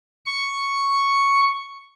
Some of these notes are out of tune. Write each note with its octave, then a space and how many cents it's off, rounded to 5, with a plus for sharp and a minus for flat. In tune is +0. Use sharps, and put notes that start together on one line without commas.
C#6 +0